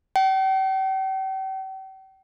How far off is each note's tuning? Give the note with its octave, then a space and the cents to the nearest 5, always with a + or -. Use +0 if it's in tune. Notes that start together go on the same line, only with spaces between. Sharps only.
G5 -40